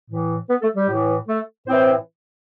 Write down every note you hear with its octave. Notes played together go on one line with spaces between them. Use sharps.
A2 E3
B3 B4
A3 A4
G3 G4
A2 E3
A3 A4
A2 E3 C4 C5